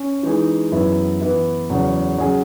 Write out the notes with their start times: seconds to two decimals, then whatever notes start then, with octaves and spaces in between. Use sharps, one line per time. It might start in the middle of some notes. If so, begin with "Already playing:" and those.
Already playing: C#4
0.23 E3 G#3 D#4 G#4
0.72 F#2 E3 B3 E4
1.21 E3 B3 E4
1.70 E2 C#3 F#3
2.18 F#3 C#4 G#4